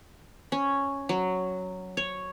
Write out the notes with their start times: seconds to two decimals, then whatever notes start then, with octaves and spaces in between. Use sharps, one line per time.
0.52 C#4
1.09 F#3
1.97 C#5